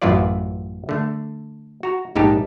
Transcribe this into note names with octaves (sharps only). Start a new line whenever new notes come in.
A1 F#2 E3 E4 F4 D5
D3 A3
F#4 A#5
A#1 G#2 D#4 G4 A5